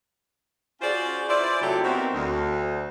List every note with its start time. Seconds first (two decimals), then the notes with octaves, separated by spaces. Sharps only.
0.81 C#4 F4 F#4 G#4 C5 D5
1.28 E4 F4 B4 C5 D5
1.61 C3 F#3 G#3 A3 E4 G4
1.84 B3 C4 D#4 F#4 A#4
2.14 D2